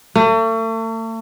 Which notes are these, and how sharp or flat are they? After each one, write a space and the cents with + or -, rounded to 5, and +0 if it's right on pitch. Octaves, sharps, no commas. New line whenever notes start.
A3 +40